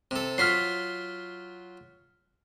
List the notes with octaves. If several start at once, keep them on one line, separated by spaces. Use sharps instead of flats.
C3 A4
F#3 F4 F6 B6 C7